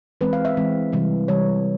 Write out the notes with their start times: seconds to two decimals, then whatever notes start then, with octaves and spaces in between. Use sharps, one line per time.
0.21 E3 G#3 C4 B4
0.33 F5
0.45 E5
0.57 E3 G#3 C4
0.92 C3 E3 G3
1.28 C3 E3 G3 C#5